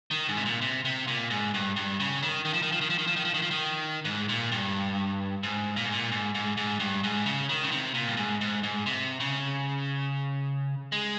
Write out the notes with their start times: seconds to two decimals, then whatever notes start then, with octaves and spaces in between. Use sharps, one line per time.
0.11 D#3
0.28 G#2
0.37 C3
0.45 A#2
0.61 C3
0.85 C3
1.07 A#2
1.30 G#2
1.54 G2
1.76 G2
2.00 C#3
2.22 D#3
2.45 D#3
2.53 F3
2.62 D#3
2.72 F3
2.81 D#3
2.90 F3
2.98 D#3
3.07 F3
3.16 D#3
3.25 F3
3.34 D#3
3.42 F3
3.51 D#3
4.05 G#2
4.29 A#2
4.52 G2
5.43 G#2
5.76 A#2
5.85 G#2
5.92 A#2
6.12 G#2
6.35 G#2
6.57 G#2
6.80 G2
7.04 G#2
7.26 C#3
7.49 D#3
7.64 C#3
7.71 C3
7.94 A#2
8.08 G2
8.17 G#2
8.41 G#2
8.63 G#2
8.86 C3
9.20 C#3
10.92 G#3